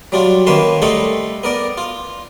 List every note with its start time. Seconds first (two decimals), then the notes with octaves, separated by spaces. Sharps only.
0.12 F#3 G3 D4 F4
0.47 D#3 A#3 C#4 B4 A5 C6
0.82 G3 A3 D#4 A4 F#5 C6
1.43 B3 A#4 D5
1.78 F4